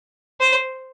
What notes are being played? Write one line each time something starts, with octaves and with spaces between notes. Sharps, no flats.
C5